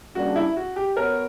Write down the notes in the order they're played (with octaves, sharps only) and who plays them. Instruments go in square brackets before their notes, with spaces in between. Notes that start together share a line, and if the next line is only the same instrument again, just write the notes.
[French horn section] C#3 G3 A#3 D4 [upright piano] F#4
[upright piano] E4
F#4
G4
[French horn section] B3 F#4 C#5 [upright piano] A#4